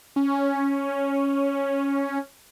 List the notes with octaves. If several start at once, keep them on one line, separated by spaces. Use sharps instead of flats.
C#4